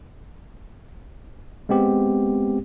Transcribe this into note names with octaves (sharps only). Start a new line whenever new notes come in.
G#3 B3 C4 G4